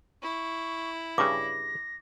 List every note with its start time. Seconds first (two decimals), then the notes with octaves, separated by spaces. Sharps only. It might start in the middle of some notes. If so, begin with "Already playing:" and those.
0.23 E4 C#6
1.18 G2 C#3 D6 A#6